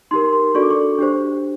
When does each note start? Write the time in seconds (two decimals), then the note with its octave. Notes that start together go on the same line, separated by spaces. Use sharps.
0.11 D#4 G4 A#4 C6
0.33 C6
0.54 D4 F#4 A4 D5 C#6
0.62 D6
0.70 C#6
0.99 D4 G4 C5